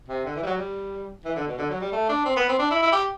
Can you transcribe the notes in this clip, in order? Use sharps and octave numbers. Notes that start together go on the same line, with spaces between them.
C3
D3
E3
G3
F#3
G3
E3
D3
B2
D3
F#3
G3
A3
D4
C4
B3
C4
D4
E4
E4
G4